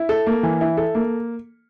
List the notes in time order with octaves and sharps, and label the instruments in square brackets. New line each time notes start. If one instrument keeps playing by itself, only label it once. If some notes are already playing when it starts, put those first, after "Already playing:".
Already playing: [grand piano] E4
A4
A#3
E3
E4
A4
A#3